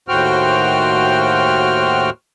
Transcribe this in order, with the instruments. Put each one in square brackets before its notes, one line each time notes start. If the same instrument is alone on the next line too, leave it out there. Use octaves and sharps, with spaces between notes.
[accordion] D#2 A2 F#4 C5 G5 F6